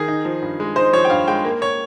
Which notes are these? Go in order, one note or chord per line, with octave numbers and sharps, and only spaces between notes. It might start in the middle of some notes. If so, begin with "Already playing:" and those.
Already playing: D#3 G#4
D#4
F3
G2
G#3
D#4 C5
F3 C#5
G5
G2 F5
G#3 G5
A#3
C#5